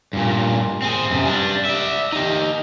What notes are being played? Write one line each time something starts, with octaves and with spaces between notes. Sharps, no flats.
G2 A#2
C4 G#4
F#2 C3
G3 D4
D5 E5
D#4 G4